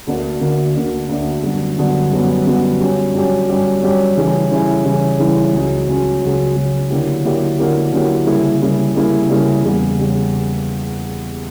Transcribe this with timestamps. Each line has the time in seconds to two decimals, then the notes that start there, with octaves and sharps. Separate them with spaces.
0.07 D2 D3 A#3 D4 F#4
0.41 D2 D3 A#3 D4 F#4
0.75 D2 D3 A#3 D4 F#4
1.09 D2 D3 A#3 D4 F#4
1.43 F#2 D3 G3 B3 F#4
1.77 F#2 D3 G3 B3 F#4
2.12 F#2 D3 G3 B3 F#4
2.46 F#2 D3 G3 B3 F#4
2.80 G2 F#3 C#4 G4
3.14 G2 F#3 C#4 G4
3.49 G2 F#3 C#4 G4
3.82 G2 F#3 C#4 G4
4.16 C#3 E3 G3 C#4 E4
4.51 C#3 E3 G3 C#4 E4
4.85 C#3 E3 G3 C#4 E4
5.19 C#3 E3 G3 C#4 E4
5.53 C#2 C#3 F#3 C#4 F#4
5.88 C#2 C#3 F#3 C#4 F#4
6.22 C#2 C#3 F#3 C#4 F#4
6.56 C#2 C#3 F#3 C#4 F#4
6.90 D3 F#3 A#3 E4 G4
7.24 D3 F#3 A#3 E4 G4
7.59 D3 F#3 A#3 E4 G4
7.92 D3 F#3 A#3 E4 G4
8.27 C#3 G3 A#3 E4
8.61 C#3 G3 A#3 E4
8.95 C#3 G3 A#3 E4
9.30 C#3 G3 A#3 E4
9.64 E2 C#3 G3
9.99 C#3 G3